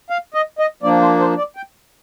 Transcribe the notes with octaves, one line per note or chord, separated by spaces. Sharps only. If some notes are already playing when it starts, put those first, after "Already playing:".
F5
D#5
D#5
F3 A#3 D4 D5
C5
C5
D5
G5